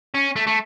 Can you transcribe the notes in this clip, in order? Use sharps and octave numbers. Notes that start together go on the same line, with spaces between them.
C#4
A3
A3